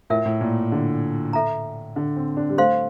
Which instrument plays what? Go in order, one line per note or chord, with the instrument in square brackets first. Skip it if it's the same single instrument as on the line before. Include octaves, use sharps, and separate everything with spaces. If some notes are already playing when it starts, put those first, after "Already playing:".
[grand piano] A2 [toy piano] F4 A#4 E5
[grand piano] A2
A#2
D3
[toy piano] A4 E5 A#5
[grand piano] D3
C4
D4
G3
[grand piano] A3 [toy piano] C5 F5 C6